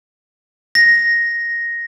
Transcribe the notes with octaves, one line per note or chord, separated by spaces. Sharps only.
A#6